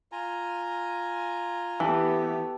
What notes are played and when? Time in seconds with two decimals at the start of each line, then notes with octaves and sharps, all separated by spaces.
0.12 F4 G#5 A#5
1.80 E3 A3 B3 G4 G5 A5